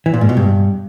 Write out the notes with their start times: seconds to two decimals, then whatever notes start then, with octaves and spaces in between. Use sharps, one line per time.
0.06 E3
0.14 A#2
0.21 G#2
0.29 B2
0.37 G2